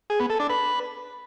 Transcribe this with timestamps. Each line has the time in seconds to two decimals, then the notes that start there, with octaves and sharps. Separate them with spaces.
0.10 G#4
0.20 B3
0.30 A4
0.40 D4
0.50 B4